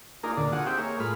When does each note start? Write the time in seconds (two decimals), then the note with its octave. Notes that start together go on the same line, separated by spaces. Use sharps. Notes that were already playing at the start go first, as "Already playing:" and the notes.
0.23 A#3 D4 D#4 F4 G#4 A#4
0.37 D2 A#2 D3 D4
0.52 F4 F#4 G#4 D#5 F#5
0.66 C4 D#4 G4 E5 G5
0.78 A#3 G#4 C#5
1.00 A2 G#3 F4 B5 F6